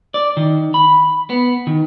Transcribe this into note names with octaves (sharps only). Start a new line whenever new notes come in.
D5
D#3
B5
B3
D#3